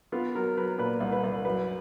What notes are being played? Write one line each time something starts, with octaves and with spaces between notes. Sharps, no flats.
B3 F4
F#3 A#4
F#3 B4
A#2 B4
C2
B4
C2
F#2 B4